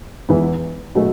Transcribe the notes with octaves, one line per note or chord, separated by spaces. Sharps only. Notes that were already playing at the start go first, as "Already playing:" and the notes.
E2 E3 B3
B2 F#3 A3 F#4 A4